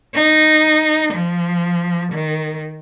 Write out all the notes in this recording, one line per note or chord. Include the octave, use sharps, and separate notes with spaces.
D#4
F3
D#3